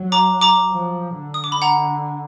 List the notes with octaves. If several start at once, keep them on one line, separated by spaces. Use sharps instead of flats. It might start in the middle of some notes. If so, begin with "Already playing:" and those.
Already playing: F#3
A#5 D6
A#5 D6
F3
D3
D#6
D6
B5
F#5 A#5